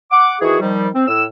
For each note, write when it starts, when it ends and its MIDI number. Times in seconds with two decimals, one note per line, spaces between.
0.11 0.36 78
0.11 0.36 86
0.41 0.59 51
0.41 0.59 52
0.41 0.59 66
0.41 0.59 68
0.61 0.88 51
0.61 0.88 53
0.61 0.88 55
0.94 1.04 60
1.07 1.23 45
1.07 1.23 88